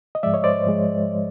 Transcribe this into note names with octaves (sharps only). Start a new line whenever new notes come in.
D#5
G#2 F3 G#3 D5 E5
C#5 D#5
C5 D5
G#2 F3 G#3